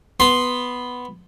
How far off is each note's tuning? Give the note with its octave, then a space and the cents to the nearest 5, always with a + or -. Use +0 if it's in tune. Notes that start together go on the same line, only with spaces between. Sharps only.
B3 +0 C6 +0